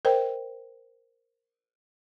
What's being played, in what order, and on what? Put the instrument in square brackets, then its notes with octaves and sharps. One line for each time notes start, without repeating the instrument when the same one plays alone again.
[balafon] A#4 C5 D#5 G5